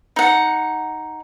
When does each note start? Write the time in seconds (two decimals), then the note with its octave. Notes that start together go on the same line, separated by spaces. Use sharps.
0.16 D#4 F#5